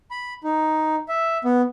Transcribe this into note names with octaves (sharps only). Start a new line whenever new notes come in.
B5
D#4
E5
B3